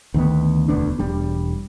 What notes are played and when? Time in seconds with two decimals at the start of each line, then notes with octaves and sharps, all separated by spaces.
0.14 D2 D#3 B3
0.68 E1 D2 B3 D4
0.99 E1 G3 D4